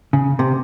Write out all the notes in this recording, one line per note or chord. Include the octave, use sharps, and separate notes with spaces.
C#3
C3